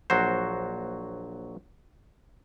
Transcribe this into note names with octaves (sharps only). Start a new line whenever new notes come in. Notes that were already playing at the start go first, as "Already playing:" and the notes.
A#1 F#3 F#4 C5